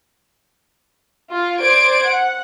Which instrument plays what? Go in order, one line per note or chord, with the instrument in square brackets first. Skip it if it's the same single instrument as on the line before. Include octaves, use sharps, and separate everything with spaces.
[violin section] F4
C5 D5 G#6 D7
F#5